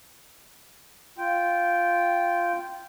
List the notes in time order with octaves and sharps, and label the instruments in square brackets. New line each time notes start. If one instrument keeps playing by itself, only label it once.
[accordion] F4 G5